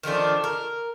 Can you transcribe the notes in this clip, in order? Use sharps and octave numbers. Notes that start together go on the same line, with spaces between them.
D#3 F3 A3 D4
A#4